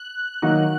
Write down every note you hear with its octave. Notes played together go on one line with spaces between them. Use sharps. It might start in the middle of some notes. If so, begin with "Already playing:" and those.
Already playing: F#6
D#3 F#3 A#3 D#4 F#4